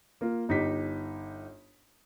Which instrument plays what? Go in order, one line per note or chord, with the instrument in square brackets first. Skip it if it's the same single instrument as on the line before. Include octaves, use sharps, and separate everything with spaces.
[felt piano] A#3 F4
G1 D#4 G4 B6